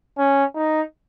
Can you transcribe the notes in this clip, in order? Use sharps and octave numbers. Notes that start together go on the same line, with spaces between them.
C#4
D#4